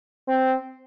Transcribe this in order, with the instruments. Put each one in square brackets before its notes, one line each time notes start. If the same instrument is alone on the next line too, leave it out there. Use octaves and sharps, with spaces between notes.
[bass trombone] C4